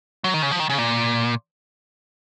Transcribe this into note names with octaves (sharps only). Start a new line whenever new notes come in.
F#3
D#3
C#3
F3
D#3
C#3
A#2